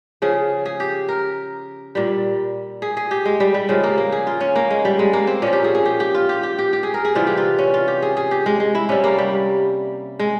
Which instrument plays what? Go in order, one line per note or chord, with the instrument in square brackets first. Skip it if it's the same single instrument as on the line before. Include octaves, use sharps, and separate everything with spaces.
[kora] C#3 F3 G#4
G#4
G4
A#4
A#2 G3
G#4
G#4
G4
G#3
G3
G3
C#3 F3 G#3
A#3
A#3
G#4
F4
C#4
A#3
G#3
G3
G#3
A#3
C4
A#2 F3 C#4
G4
G#4
G#4
G4
G4
F4
G4
G4
G4
G4
G#4
A#4
G#4
C3 E3 G3 F4
G4
F4
C#4
F4
G4
G#4
G#4
G4
G#3
G#3
E4
C3 G3 C#4
A#3
G3
G#3